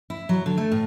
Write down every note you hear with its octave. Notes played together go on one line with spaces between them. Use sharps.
E4
F#3
D3
A3
A2